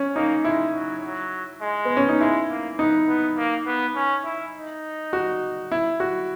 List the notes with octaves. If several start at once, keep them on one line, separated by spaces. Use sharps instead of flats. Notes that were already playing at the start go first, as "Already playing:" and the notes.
Already playing: C#4
A#3 D#4
G#3 E4
F#3
F#3
G#3
B3
C#4
D#4
G#3 E4
A#3
B3 D#4
B3
A#3
B3
C#4
E4
D#4
F#4
E4
F#4